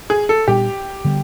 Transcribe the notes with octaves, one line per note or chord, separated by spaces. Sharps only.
G#4
A4
A#2 G3 B3 D4 G4
D3 G3 B3